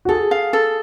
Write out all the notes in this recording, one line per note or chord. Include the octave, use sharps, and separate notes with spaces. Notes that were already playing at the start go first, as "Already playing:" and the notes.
F#4
G#4 A4
F5
A4